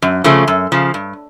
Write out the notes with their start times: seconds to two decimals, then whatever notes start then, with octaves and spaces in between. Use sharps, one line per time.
0.02 F#2
0.24 C#3 F3 A3
0.48 F#2
0.72 C#3 F3
0.94 G2